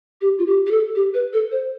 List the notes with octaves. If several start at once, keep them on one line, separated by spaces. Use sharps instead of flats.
G4
F4
G4
G4
A4
G4
B4
A4
C5